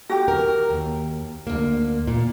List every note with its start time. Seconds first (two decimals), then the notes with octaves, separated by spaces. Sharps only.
0.10 F#4 G4
0.28 A#4
0.70 D#2
1.47 D2 A#3
2.07 A#2